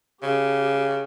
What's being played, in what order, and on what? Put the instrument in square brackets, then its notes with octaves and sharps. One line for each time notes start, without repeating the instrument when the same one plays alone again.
[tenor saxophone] C#3 [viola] G4